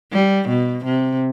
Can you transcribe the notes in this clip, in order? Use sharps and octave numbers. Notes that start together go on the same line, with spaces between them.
G3
B2
C3